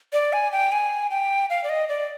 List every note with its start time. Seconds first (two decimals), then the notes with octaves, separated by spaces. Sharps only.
0.13 D5
0.33 G#5
0.52 G5
0.72 G#5
1.11 G5
1.50 F5
1.64 D5
1.69 D#5
1.89 D5